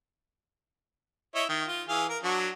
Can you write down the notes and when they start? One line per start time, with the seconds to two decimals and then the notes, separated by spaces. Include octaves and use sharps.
1.35 E4 C#5 D#5
1.49 D#3
1.68 F4
1.89 E3 G#4 F5
2.10 A#4
2.23 F#3 D4 F#4